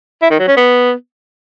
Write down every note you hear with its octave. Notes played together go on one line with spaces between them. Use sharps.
E4
D#3
F#3
C#4
B3